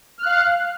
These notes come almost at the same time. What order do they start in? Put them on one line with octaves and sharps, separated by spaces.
F6 F#6 F5